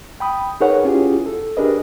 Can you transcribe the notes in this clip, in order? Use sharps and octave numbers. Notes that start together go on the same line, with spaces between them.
G5 B5 D#6
D#4 G#4 A#4 B4 C#5 F#5
C#4 E4 F4 G4 G#4
A4
D4 G4 G#4 A#4 B4 D#5